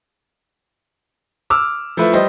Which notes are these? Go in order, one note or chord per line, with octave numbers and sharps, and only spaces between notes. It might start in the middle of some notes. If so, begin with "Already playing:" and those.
D6 E6 F6
F3 A3 E4 B4
G3 C5 D#5